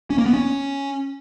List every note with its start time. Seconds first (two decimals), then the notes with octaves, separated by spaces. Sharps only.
0.10 C#4
0.18 A#3
0.26 B3
0.34 C#4